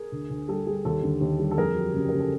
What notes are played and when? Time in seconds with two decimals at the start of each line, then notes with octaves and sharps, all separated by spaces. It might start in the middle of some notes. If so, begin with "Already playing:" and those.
Already playing: G#4 A#4
0.12 D2
0.30 D2
0.48 G3 A4
0.67 G3 G#4
0.85 D#2 A4
1.03 D3
1.21 D#2
1.39 G3
1.51 A4
1.57 F2 G#4 A#4
1.75 F#3
1.94 C#3
2.09 C#3 A#4
2.20 A4